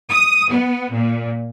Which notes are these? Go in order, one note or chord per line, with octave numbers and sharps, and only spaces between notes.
D#6
B3
A#2